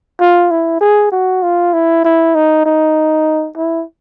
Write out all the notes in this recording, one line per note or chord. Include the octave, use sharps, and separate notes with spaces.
F4
E4
G#4
F#4
F4
E4
E4
D#4
D#4
E4